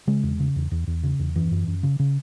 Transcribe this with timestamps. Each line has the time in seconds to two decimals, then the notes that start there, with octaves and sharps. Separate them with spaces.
0.07 C#3 G#3
0.23 E2
0.40 C#3
0.56 E2
0.71 E2
0.87 E2
1.03 C#3
1.19 E2
1.35 F#2 E3
1.51 F#2
1.67 F#2
1.83 C#3
1.99 C#3